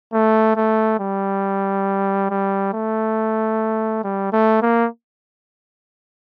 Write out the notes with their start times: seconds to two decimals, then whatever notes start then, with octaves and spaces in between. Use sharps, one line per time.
0.13 A3
0.56 A3
1.00 G3
2.30 G3
2.73 A3
4.04 G3
4.33 A3
4.62 A#3